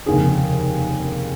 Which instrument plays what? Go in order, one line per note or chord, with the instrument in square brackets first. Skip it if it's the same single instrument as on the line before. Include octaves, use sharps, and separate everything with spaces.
[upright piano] F1 D#2 C#3 G#4